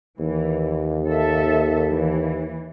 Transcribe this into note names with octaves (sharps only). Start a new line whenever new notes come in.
D#2 E3
A4 E5
E3